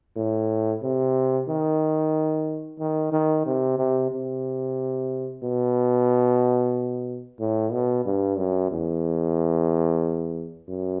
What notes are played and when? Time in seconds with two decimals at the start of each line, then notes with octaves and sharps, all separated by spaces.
0.16 A2
0.83 C3
1.48 D#3
2.79 D#3
3.12 D#3
3.46 C3
3.78 C3
4.11 C3
5.43 B2
7.40 A2
7.72 B2
8.05 G2
8.38 F#2
8.71 E2
10.69 F#2